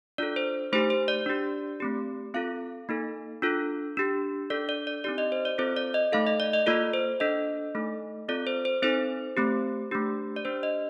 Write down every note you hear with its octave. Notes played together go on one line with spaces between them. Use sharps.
D4 F4 A4 D5
C5
A3 D#4 G4 C5
C5
D5
D4 G4
A3 C4 G4
C4 F4 A4 F5
A#3 D#4 A4
D4 F4 A4
D4 G4
D4 A4 D5
D5
D5
C4 D#4 G4 D5
D#5
C5
D5
C4 F4 A4 C5
D5
D#5
A3 D#4 A4 F5
D#5
D5
D#5
A#3 F4 A4 D5
C5
D4 A4 D#5
A3 D#4 A4
C4 F4 A4 D5
C5
C5
C4 D#4 A4 C5
A3 C4 G4
A3 D4 G4
D5
D4 G4 C5
D#5